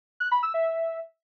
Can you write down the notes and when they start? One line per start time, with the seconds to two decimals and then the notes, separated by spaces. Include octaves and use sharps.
0.20 F#6
0.31 B5
0.43 E6
0.54 E5